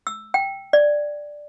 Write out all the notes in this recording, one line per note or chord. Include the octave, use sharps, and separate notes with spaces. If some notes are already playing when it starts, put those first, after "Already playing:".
E6
G5
D5